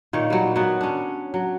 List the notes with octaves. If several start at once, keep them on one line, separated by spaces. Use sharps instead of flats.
A#2 D#3 C#5
F#3 G3
F#3 B3
C#4 D4
F#3